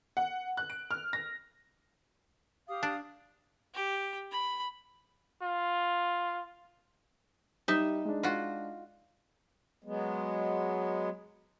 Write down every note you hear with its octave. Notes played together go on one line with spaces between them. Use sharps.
F#5
F#6
D7
F6
A#6
G4 F5 D#6
D4
G4
B5
F4
G3 D#4 E5
G#3 D4
F4 F#4
F#3 G#3 B3